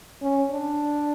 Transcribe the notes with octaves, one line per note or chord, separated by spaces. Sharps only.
C#4
D4